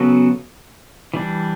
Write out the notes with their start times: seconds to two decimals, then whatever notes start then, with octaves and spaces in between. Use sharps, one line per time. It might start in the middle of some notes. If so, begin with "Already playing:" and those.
Already playing: C#3 F#3 B3 F#4 A4
1.14 E3 G3 D4